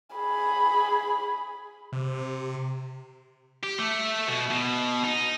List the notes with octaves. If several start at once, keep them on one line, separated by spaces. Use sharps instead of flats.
G#4 B5
C3
G4
A3
B2
B2
D#4